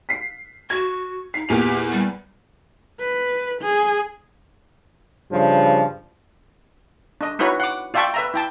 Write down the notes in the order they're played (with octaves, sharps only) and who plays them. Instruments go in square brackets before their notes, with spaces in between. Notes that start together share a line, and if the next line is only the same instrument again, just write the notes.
[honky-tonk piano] B6 C7
[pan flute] F#4 [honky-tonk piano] G#6
[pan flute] D#4 [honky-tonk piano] C7
[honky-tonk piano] E2 A#2 F7 [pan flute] G4
[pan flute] G3
[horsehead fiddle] B4
G#4
[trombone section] G2 C#3 F3
[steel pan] D4 D#5
D#4 E4 F#4 B4 C#5
F#5 D6
F4 D5 E5 G5 A5 C#6
B4 E5 A#5
E4 G5 A5